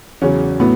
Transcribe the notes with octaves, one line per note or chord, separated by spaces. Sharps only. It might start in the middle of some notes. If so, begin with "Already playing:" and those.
E2 C#3 F#3 C#4
A2 F#3 B3